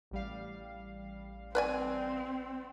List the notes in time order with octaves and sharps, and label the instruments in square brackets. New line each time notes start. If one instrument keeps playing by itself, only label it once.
[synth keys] A1 G3 F5
[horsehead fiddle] C4 [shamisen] B4 D5 G#5